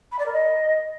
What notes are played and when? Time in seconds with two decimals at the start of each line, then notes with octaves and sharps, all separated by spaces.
0.12 B5
0.19 D5
0.26 A#4
0.33 D#5